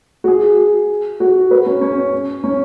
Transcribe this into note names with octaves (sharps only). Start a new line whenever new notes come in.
F#4
G#4
F#4
B4
C#4
C#4
C#4